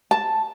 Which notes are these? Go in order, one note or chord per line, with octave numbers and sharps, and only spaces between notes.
A5